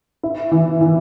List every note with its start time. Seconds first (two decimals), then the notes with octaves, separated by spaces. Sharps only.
0.23 E4
0.51 E3
0.81 E3